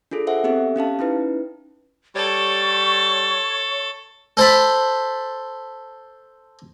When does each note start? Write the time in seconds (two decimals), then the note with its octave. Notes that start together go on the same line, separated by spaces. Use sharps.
0.11 D4 F4 G#4 A4
0.27 A4 C5 E5 F#5
0.44 B3 C4 G4 A4 E5
0.76 C#4 G4 F5 A5
0.99 C#4 D#4 E4 B4
2.15 G3 A4 C#5 C#6
4.37 A4 C5 A5 B5